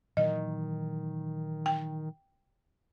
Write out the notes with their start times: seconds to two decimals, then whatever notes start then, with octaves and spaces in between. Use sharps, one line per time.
0.17 A#2 D#3 E3 F#3 D#5
1.66 G5